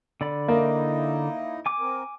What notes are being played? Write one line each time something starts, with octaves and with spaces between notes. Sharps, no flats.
D3 D5 B5
A#3 D#4 E4 D#5
G#5 D6
C4 A#4